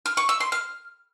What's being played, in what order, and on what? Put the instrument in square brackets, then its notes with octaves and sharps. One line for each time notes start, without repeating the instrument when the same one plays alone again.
[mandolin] F6
C#6
E6
C6
F6